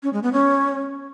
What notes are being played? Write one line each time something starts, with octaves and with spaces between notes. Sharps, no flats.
C#4
G#3
B3
C#4